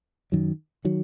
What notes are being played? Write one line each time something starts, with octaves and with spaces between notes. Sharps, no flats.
F#2 D#3 F#3
D#3 F#3